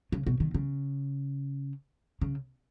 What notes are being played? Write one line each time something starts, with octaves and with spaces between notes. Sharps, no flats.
C#3
B2
D#3
C#3
C#3